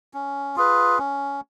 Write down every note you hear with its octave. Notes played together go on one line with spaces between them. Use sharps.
C#4
F4 G#4 B4
C#4